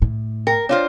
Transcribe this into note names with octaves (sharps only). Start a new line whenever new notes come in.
A2
A#4 G5
D4 F4 C5 C#5 F5